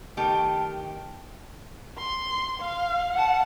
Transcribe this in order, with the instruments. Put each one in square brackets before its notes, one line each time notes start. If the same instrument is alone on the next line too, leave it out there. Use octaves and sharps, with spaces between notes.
[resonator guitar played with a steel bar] D#3 A3 G4 G5
[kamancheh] C6
F5
F#5 A5